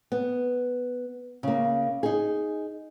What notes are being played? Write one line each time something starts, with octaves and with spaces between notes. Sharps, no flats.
B3
C#3 A#3
D#4 G#4